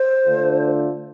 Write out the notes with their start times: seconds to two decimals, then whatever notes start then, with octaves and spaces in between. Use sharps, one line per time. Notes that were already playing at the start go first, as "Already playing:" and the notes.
Already playing: C5
0.24 D3 A3 D4 F4 A4